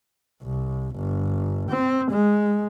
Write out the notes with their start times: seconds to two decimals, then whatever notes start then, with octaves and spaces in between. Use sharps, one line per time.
0.43 C2
0.96 G1
1.70 C4
2.11 G#3